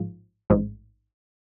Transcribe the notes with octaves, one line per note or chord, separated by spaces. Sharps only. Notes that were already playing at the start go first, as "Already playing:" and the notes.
Already playing: A1 G#2 F3
A1 G#2 F3